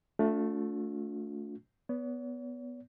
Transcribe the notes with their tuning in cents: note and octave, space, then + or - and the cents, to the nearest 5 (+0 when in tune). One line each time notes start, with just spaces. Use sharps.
A3 +0 D4 -35 F4 +40
B3 +0 C#5 +45